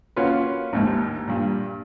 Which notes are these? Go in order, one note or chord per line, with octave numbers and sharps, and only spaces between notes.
A#3 C#4 F4 F#4 B4
A1 D#2 G#2
G2 A#2